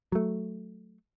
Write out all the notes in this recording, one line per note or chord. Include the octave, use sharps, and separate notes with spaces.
F#3 A3